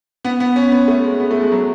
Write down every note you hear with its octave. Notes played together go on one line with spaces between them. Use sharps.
B3
B3
C#4
B3
A3
G#3
B3
A3
G#3
F#3